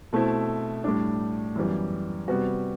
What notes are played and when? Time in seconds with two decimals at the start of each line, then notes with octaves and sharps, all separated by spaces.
0.13 B2 A3 C4 E4
0.84 A2 G3 D4
1.56 F#2 E3 G3 B3
2.28 C3 G3 B3 F#4